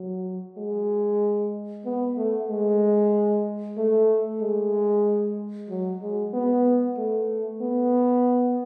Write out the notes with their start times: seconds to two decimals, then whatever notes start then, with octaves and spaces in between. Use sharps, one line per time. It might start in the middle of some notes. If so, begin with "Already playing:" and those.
Already playing: F#3
0.57 G#3
1.85 B3
2.17 A3
2.49 G#3
3.77 A3
4.41 G#3
5.69 F#3
6.02 G#3
6.33 B3
6.97 A3
7.61 B3